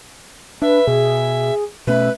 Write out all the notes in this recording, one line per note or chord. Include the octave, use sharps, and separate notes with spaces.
D4 B4 E5
B2 G#4
B2 A3 C#4 B4 E5